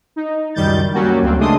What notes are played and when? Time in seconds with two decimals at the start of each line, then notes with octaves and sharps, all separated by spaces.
0.16 D#4
0.55 C#2 F#2 D#3 G3 G6 A6
0.94 F#3 G3 A#3 C#4 F#4
1.22 D2 A#3 C4
1.38 C#3 G#3 A3 D4 C6 D#6